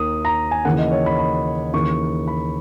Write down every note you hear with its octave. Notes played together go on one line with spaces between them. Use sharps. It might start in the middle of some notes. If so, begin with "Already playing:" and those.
Already playing: D#2 D#3 D#6
A#5
G#5
D#2 C#3 E3 F#5
D#5
C#5
B5
B5
D#2 C#3 E3 C#6
B5